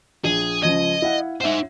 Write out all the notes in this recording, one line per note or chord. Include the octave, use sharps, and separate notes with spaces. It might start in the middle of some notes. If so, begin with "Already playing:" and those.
A#1 G#4
C#2 F3 D#5 G#6
E4 F5 F#5
D#4 C5 E5 F#5